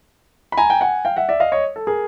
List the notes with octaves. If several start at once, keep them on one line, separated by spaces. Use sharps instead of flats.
B5
G#5 A#5
G5
F#5 G#5
F5 G5
E5 F#5
D5 E5
D#5 F5
C#5 D#5
A4
G#4 A#4